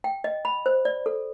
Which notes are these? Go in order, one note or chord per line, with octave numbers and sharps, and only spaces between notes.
G5
D#5
B5
C5
D5
A4